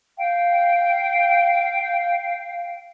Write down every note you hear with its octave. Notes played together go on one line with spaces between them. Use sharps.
F5 G5